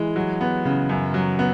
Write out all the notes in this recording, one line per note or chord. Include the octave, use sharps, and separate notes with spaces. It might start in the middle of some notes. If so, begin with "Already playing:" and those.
Already playing: E3 G#3
F#3
B3
C#3
F#2
F#3
B3